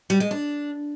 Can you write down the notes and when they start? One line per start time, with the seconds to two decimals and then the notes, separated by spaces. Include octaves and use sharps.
0.10 G3
0.20 G#3
0.31 D4